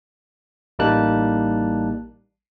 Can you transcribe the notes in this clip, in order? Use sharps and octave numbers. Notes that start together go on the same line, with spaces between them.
A1 G3 A#3 D#4 A5 F#6